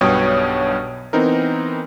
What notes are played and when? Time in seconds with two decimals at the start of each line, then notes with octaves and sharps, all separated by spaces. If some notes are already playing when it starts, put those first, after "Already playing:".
0.01 B1 G2 B2 C#5 G5 D#6
1.13 E3 B3 C4 D#4 A#4